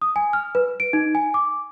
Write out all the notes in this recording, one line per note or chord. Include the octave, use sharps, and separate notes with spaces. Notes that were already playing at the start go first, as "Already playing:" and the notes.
D#6
G#5
F6
B4
D7
D#4
G#5
D6